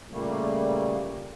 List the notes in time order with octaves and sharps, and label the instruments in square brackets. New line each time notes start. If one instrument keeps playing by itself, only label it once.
[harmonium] A#2 C#3 G3 A3 A#3